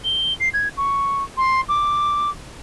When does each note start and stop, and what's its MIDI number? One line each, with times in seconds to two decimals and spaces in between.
0.05 0.34 103
0.40 0.49 96
0.54 0.68 92
0.77 1.23 85
1.38 1.61 84
1.69 2.30 86